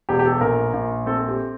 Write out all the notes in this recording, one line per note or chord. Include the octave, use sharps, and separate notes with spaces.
E1 G4
G4
A4
A#1 A#4
A#1
C4 A4
A4
G4